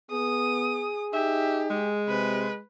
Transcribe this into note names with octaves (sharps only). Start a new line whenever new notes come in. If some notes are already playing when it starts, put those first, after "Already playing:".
B3 G#4 D#6
D#4 G4 E5
G#3
C3 B4